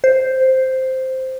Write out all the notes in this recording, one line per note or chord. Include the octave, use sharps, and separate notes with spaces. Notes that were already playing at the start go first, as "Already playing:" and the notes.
C5